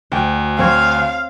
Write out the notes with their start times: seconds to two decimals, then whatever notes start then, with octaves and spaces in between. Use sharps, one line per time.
0.12 D2 G5
0.59 C4 C#5 F5